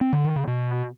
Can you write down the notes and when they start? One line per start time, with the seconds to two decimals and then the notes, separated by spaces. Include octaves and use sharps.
0.01 C4
0.13 D3
0.24 D#3
0.36 C#3
0.47 B2